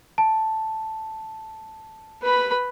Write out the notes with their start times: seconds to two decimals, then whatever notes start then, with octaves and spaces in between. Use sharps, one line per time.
0.18 A5
2.23 B4 B5